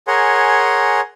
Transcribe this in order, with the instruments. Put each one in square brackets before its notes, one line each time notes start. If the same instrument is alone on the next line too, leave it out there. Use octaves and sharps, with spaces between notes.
[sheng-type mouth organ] G#4 A#4 C#5 F#5 G#5 C6